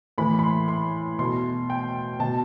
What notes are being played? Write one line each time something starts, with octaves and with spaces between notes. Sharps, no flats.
A2 E3 B5
B5
C6
C6
B2 C6
G5
B2 A5